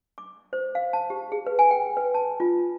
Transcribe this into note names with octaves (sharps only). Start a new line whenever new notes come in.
D6
C5
F5
A5
G4
G#4
B4
G#5
G5
B4
A5
F4